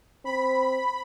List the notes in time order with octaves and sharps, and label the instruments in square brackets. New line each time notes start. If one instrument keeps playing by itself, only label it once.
[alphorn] C4 [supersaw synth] B5